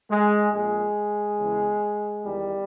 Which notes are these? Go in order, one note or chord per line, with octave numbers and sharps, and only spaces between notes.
G#3
A#1 A#2 G#3
E2 C#3 E3
E2 D#3 G3